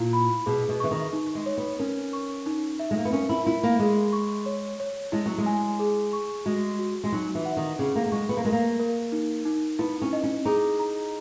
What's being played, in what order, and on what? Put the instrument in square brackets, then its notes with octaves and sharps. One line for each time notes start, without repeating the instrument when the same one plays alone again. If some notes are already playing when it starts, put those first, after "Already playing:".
Already playing: [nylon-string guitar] A#2 [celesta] E4
[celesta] B5
[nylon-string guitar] B2 [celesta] G#4
[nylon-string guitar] B2
[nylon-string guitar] E3 [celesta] C#6
[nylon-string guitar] D#3
[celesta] D#4
[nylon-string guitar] G#3
[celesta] C#5
[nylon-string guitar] B3
[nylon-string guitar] C#4 [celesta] A#4
[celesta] C#6
D#4
E5
[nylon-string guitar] G#3
A#3
B3
[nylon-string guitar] C#4 [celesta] A#4
[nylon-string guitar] E4
[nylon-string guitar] E4 [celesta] B5
[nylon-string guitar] A#3
[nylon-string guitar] G#3 [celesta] G#4
[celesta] C#6
C#5
C#5
[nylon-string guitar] G#3 [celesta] E4
[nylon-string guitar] F#3
G#3
[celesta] G#5
G#4
C#6
[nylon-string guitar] G#3 [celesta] F#4
[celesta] F#4
[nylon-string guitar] G#3
[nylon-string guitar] F#3 [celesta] D#4
[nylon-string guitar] E3
[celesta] F#5
[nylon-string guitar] D#3
[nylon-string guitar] C#3 [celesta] G#4
[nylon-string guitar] A#3
A#3
[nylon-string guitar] G#3 [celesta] C#6
[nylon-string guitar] B3
A#3
[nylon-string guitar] G#3 [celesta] A#4
[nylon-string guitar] A#3
[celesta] A#4
D#4
D#4
[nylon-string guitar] B3 [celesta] E4
[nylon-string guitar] C#4
[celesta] D#5
[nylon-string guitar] C#4
[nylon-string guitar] D#4 [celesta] G#4
[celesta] A#5